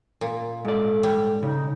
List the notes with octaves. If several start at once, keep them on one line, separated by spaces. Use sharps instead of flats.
A#2
G#2 A4 D5
G3
C#3 D#4